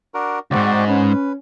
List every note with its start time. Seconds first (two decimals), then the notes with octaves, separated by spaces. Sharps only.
0.14 D4 F#4 A#4
0.51 C#2 G#2 C4 F#4 D5
0.88 C#4 B4